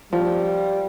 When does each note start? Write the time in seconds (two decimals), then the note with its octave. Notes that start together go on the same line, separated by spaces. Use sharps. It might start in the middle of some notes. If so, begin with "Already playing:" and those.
0.12 F3 G3